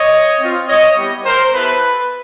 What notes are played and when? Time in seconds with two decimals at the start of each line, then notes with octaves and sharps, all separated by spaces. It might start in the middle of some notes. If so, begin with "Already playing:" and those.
Already playing: C#5 D#5
0.39 C4 F4
0.68 C#5 D#5
0.96 G3 B3 E4 G4
1.25 A#4 C5
1.54 B3 E4 G4 A4 B4